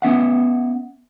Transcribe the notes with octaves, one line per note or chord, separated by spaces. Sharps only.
B3 C#4 E5 F#5